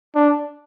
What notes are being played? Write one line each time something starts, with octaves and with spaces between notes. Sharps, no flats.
D4